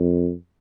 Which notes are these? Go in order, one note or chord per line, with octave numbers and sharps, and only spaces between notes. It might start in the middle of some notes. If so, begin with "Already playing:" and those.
Already playing: F2